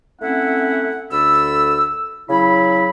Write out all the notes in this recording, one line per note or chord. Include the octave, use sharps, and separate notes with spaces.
A3 C4 C#4 E4 F#5
D2 A4 B5 E6
C#3 F#3 E4 B5